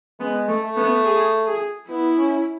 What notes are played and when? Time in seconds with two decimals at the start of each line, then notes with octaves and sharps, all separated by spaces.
0.20 G#3 B3
0.48 A3
0.62 A3
0.77 B3
1.05 G#4
1.46 G#4
1.89 B3 E4
2.17 C#4